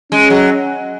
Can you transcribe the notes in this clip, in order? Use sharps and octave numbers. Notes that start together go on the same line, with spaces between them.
G#3 C#4
F#3